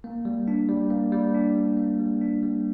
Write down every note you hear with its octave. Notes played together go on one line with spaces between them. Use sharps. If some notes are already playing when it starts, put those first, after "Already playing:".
A#3
G3
D4
G3
A#3
G3
D4
G3
A#3
G3
D4
G3